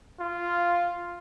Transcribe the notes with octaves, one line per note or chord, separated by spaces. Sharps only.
F4